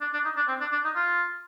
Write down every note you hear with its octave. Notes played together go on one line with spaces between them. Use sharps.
D4
D4
D#4
D4
C4
D4
D4
D#4
F4